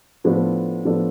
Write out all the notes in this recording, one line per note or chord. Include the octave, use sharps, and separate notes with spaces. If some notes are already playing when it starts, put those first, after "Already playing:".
A2 F3 B3 D4 A4
A2 F3 B3 D4 A4